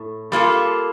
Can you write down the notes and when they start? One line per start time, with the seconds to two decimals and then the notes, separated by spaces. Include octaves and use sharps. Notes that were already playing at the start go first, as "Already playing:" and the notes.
Already playing: A2
0.32 G3 A#3 F4 A4